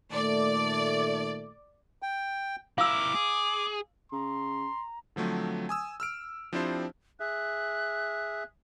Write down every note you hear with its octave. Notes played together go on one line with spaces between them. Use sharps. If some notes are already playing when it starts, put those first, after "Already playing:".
A#2 D#3 A3 D5
G5
E4 A#4 F5 D6 E6
G#4
C#3 A#5 C6
D3 F3 F#3 A3 C4
G#5 D#6 E6
E6 F6 D7
F3 C4 D4 E4 G4 C5
G#4 E5 F#6